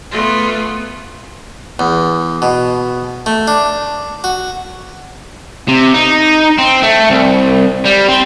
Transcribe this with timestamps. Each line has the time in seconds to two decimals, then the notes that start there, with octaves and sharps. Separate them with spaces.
0.11 A3 B3 F4 G#4
1.79 E2
2.42 B2
3.26 A3
3.48 D4
4.24 F#4
5.68 C3
5.94 D#4
6.58 C4
6.83 A3
7.10 C2
7.86 G3
8.09 C4